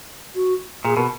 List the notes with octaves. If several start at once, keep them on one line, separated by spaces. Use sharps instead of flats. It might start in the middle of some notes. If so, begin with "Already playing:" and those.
F#4
A#2 G#4
B2 A#4